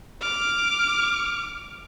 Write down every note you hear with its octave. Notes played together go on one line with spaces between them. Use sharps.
D6 F6